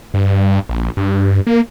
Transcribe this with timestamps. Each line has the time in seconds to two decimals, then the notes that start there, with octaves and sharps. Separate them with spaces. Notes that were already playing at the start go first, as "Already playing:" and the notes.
0.14 G2
0.69 A#1
0.97 G2
1.47 A#3